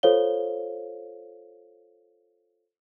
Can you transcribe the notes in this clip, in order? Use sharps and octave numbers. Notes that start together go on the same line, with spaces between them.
F4 A4 C5 C#5 F5 G7